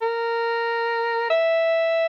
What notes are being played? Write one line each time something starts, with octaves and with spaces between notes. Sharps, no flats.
A#4
E5